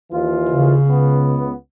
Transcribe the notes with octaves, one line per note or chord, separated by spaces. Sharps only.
D#2 E3 F4
C#3
C#2 B3